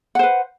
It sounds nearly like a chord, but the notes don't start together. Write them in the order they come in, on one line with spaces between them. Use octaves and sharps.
F#5 C5 B4